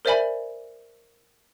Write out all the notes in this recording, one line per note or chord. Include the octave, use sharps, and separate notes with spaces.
A#4 C5 D5 E5 G#5 B5